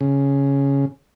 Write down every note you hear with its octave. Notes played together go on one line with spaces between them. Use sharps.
C#3